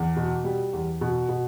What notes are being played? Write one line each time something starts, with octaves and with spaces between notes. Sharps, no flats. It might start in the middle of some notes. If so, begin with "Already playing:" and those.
Already playing: E2
B2
G3
E2
B2
B2